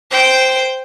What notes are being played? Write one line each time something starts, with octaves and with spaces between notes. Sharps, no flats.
C5 G5